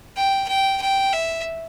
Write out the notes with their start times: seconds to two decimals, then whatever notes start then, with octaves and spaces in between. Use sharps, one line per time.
0.17 G5
0.48 G5
0.81 G5
1.13 E5